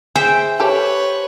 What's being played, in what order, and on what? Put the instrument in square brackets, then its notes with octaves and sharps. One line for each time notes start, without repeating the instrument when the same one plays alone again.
[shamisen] G#4 [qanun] C5 E5 G5
[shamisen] G4 A4 [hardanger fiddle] B4 C#5